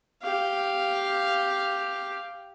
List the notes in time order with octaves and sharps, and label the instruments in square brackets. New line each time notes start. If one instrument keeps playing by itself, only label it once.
[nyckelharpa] G4 F5